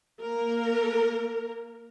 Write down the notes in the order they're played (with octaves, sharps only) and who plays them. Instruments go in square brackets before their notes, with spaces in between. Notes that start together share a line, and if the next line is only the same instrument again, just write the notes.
[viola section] A#3 A#4